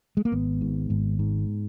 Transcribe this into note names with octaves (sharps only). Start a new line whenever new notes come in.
G#3
A#3
G#1 B3
G#2
G#1
G#2